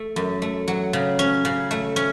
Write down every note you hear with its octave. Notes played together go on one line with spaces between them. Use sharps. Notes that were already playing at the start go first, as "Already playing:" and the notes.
Already playing: A3
F#2
A3
F#3
C#3
C#4
C#3
A3
C#4